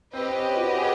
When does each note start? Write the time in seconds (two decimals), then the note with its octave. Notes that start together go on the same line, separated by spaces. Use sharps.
0.13 C4 G4 B4 D#5
0.28 C4
0.35 C#4
0.57 F#4
0.78 G#4